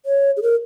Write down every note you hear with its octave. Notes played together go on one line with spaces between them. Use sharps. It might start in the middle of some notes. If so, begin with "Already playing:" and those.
C#5
G#4
A#4